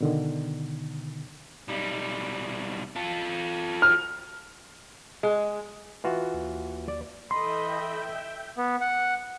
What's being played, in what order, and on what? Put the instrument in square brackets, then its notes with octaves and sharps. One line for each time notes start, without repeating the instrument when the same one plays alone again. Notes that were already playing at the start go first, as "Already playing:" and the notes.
[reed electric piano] B2 D3 D#3
[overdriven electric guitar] B1 G3
F4 A4
[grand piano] F6
[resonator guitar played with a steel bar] G#3
[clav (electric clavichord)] E3 F4 F#4
[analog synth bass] D#2
[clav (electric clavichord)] D5
[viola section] E3 A4 D#5 [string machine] E5 G5 G6 [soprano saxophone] B5 [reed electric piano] C6
[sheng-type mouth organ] B3
F#5